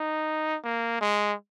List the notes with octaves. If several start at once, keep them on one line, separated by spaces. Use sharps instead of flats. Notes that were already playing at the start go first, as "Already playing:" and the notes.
Already playing: D#4
A#3
G#3